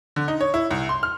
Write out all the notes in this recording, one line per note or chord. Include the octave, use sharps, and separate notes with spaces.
D3
D#4
C#5
E4
C2
C6
F6